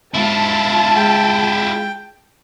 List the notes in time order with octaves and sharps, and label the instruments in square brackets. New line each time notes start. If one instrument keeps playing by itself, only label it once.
[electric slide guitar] G#2 [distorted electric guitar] E4 F4 [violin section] A5
[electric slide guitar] G#3 [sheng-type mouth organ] G5